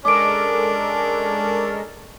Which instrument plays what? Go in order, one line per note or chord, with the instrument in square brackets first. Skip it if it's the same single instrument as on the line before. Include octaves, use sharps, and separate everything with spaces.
[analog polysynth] G#3 A4 A#4 [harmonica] C#4 D4 [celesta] D6 D7